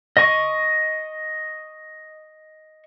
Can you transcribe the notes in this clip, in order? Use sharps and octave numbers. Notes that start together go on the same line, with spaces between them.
D#5 C#6